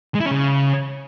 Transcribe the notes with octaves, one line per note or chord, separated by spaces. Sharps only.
G#3
E4
C#4
C#3